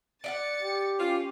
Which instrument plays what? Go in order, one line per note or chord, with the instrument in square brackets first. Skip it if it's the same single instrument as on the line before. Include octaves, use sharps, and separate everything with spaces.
[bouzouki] D5 E5 F#5 [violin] A6 C#7
[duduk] G4
[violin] C#4 [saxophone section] F4